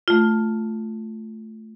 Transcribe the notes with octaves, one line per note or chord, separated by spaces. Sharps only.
A3 F4